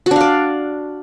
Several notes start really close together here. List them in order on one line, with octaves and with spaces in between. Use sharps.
F#4 D4 F5 D5